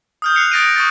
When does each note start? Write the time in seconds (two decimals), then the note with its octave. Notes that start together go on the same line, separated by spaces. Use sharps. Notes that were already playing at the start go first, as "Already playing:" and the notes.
0.22 D#6 F6 G6
0.35 F#6 C7 C#7 F7
0.52 D#6 A6 A#6 D7 D#7
0.76 C#6 D#6 A6